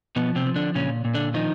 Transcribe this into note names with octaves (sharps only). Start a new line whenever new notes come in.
B2 F3 B3
C3 C4
F3
D3 D4
A#2 C#3 C#4
A#2
D3 D4
D#3 F3 D#4